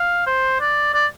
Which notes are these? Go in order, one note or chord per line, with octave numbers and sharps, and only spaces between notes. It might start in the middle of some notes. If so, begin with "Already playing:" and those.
Already playing: F5
C5
D5
D5